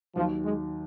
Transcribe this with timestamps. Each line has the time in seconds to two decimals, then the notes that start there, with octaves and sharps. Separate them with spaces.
0.16 D#2 D#3 F3 F#3
0.44 G#3